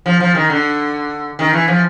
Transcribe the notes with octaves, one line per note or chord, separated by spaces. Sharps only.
F3
F3
D#3
D3
D#3
E3
F3